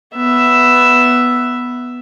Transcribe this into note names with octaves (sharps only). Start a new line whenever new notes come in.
B3 E5